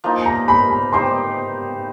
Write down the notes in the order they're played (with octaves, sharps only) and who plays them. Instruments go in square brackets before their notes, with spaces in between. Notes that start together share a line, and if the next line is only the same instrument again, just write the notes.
[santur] F3 A#3 D#4
[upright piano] A#5
B5
B5
[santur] D#4 G4 C5 [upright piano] C6